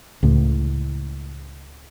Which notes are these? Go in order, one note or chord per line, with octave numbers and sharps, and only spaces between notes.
C#2 A2